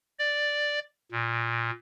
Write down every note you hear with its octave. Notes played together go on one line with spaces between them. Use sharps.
D5
A#2